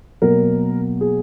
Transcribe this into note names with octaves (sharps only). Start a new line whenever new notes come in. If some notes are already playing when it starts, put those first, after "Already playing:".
B2 F#3 A#3 A#4
G#4